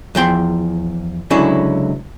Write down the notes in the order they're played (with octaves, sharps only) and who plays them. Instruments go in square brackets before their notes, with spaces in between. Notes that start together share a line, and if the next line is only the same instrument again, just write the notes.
[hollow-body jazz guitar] E2 F3 G5 C6
C#2 D3 F#3 C#4 E4